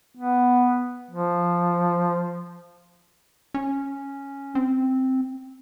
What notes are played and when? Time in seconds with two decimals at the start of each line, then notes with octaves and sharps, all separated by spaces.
0.17 B3
1.10 F3
3.54 C#4
4.55 C4